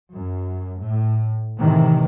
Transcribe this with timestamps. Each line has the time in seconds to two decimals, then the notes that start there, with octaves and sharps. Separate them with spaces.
0.13 F#2
0.82 A2
1.58 A2 C3 D#3 E3